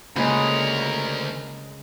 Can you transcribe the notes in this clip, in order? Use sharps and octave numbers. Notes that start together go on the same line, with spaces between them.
D2 A#2 C#3 G#3 B3 A#4 B5